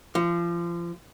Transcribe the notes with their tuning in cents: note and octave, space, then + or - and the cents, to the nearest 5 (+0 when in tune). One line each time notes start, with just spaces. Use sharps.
F3 -30